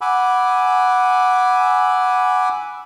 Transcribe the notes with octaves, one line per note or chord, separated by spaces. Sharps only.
F#5 G#5 B5 D6 E6